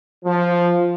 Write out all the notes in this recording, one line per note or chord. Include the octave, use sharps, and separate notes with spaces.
F3